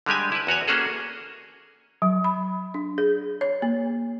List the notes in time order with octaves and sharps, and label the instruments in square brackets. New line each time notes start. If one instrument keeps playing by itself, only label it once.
[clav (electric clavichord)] D3 G3 G#3 G4 G#5
E4 B4
E2 F#4 C#5 G#5
A#3 C#4 F#4 G#4 A4
[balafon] F#3
B5
D4
G#4
C#5
A#3